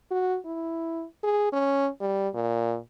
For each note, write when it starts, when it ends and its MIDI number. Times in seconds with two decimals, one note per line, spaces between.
0.11 0.37 66
0.46 1.05 64
1.23 1.49 68
1.53 1.89 61
2.00 2.28 55
2.34 2.77 46